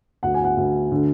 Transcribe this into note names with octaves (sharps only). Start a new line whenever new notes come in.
D2 F#5
G#5
F#5
D2
D3